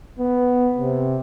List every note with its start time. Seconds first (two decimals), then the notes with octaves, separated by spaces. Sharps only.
0.19 B3
0.78 C3